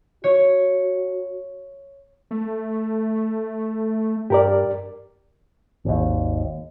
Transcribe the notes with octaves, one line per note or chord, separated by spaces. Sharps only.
F#4 C#5
A3
G2 G4 A#4 D5
G#1 D#2